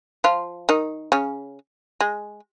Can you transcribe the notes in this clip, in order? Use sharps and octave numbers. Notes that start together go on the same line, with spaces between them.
F3 F4
D#3 D#4
C#3 C#4
G#3